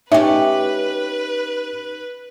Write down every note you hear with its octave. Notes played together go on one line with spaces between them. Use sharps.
C#4 D#4 G4 B4 E5